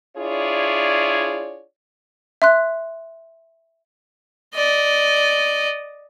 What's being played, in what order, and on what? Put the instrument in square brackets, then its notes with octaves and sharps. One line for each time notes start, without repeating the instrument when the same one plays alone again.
[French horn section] D4 E4 F4 G#4 C#5 D5
[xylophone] E5 C6 F#6
[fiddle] D5 D#5